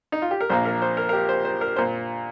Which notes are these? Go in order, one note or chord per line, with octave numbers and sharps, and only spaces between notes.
D#4
F4
G4
A#4
A#1 A#2 A#3 C5
A#4
C5
A#4
A#4
G4
C5
C5
A#4
A#2 C5